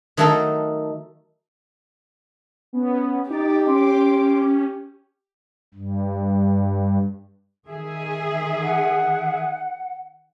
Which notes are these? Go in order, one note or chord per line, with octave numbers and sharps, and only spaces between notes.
D#3 F#3 A3 D#4 A4 A#4
B3 C#4
D#4 G4 D6 A6
C#4 C6 D6
G2
D#3 G#4 E5
F#5